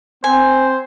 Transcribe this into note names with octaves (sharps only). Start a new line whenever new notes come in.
C4 C5 G#5